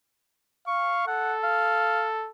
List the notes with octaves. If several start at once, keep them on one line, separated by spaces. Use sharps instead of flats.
F5 C#6
A4 F#5
F5